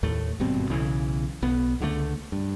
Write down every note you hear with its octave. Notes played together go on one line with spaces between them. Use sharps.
D#2 A2 A3
G#1 G2 B2 C4
B1 C#3 E3
B1 B3
C#2 D3 E3 A3
G2